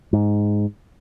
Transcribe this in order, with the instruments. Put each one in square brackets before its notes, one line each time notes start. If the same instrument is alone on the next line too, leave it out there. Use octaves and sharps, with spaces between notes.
[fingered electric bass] G#2